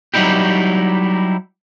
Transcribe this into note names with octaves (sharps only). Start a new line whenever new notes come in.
F#3 G3 D#4 E4 G4